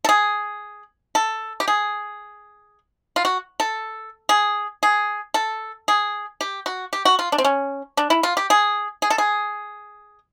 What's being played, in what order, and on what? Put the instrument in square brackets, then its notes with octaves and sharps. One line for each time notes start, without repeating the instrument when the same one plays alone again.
[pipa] A4
G#4
A4
G4
G#4
F4
F#4
A4
G#4
G#4
A4
G#4
G4
F#4
G4
F#4
F4
D4
C4
C#4
D4
E4
F4
G4
G#4
G#4
A4
G#4